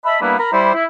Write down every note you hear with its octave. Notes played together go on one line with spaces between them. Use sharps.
D#5 E5 A5 B5
G3 A#3 B3 D4 E4 B4
A#4 A#5 B5
G3 E4 C5
E4